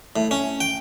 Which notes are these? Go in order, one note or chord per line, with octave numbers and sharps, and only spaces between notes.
A2
C#4
G5